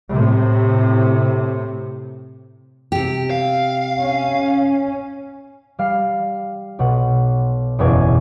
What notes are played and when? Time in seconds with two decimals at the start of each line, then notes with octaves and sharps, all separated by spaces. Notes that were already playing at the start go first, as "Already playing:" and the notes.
0.12 A2 C3
2.92 C3 G4
3.30 F5
4.01 C#4
5.79 G3 F5 F6 C7
6.79 B1 B2 F#5
7.79 F#1 E2 B2 E4 G#5 D6